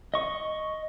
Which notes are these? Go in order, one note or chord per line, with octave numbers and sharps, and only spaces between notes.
D#5 C#6